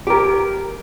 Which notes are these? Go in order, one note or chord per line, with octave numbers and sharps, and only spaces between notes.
G4 A#4